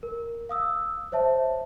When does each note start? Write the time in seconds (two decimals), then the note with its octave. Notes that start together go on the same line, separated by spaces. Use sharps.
0.03 A#4
0.49 F5 D#6 E6
1.12 C5 C#5 E5 A5